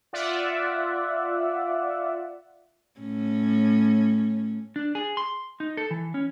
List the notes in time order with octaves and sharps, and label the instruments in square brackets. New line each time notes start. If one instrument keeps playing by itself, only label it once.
[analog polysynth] F4 D5 E5 F#5
[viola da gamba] A2 C#4
[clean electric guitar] D4
G#4
C6
D#4
A4
E3
C#4